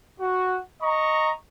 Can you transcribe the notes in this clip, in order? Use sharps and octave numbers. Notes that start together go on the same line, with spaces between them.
F#4
D#5 A#5 C#6